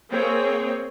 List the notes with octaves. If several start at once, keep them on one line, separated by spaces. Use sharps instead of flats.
A#3 C4 G#4 C#5 G5